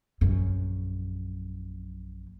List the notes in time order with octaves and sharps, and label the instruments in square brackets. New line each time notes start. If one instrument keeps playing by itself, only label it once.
[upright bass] A#1 F#2